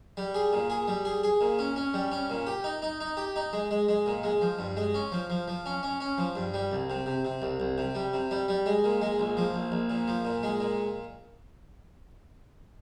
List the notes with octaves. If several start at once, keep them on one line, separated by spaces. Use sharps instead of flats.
G3
G#4
A#2
G#4
G3
G#4
G#4
A#2
C#4
C#4
G3
C#4
A#2
G4
D#4
D#4
D#4
G4
D#4
G#3
G#3
G#3
A#2
G#3
F3
G2
G#3
C#4
F3
F3
F3
C#4
C#4
C#4
F3
G2
G3
C2
C3
C3
C3
C2
C2
C3
G3
C3
G3
G3
G#3
A#2
G#3
A#1
F3
A#1
A#1
A#2
F3
A#2
G#3
A#2